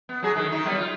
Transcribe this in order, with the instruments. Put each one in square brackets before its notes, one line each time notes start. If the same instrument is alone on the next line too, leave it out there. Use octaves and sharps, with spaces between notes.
[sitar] B3
F#3 G#4
D3 D#3
D#3 D#4
F#3 G3 B3
F4